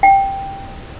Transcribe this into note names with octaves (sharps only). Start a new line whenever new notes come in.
G5